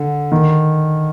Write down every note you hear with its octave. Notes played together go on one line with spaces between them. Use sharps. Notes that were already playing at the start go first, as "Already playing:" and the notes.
Already playing: D3
D#3